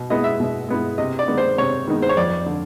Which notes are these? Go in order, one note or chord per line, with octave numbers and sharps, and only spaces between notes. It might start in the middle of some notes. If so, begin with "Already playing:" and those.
Already playing: B2
G#3 B3 E4 D#5
E5
B2
G#3 B3 E4
C3 D#5
D5
D#3 G#3 B3 D#4
C5
C3 C#5
D#3 G#3 B3 D#4
C5
C#5
F2 D5
D3